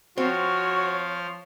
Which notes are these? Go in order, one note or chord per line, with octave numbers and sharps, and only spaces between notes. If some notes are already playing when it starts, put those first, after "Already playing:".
F3 C4 F#4 C#5 F5